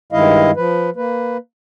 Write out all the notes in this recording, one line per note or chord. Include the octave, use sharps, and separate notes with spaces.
G2 D#3 G#3 E4 D#5 F5
F3 B4
A#3 B4